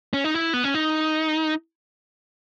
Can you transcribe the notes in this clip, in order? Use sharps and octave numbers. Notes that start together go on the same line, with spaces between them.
C#4
D#4
E4
B3
C#4
D#4